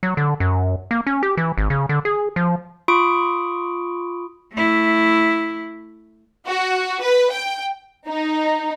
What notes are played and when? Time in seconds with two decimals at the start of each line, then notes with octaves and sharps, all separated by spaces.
0.03 F#3
0.17 D3
0.40 F#2
0.91 A#3
1.07 C#4
1.23 G4
1.37 E3
1.58 G#1
1.70 C#3
1.89 D3
2.05 G#4
2.36 F3
2.88 F4 B5 C#6 D#6 D7
4.53 A3 E4
6.47 F#4
7.02 B4
7.31 G5
8.07 D#4